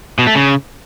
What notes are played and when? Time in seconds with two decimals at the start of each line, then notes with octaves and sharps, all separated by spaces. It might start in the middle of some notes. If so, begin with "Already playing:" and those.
0.19 B2
0.27 A3
0.35 C#3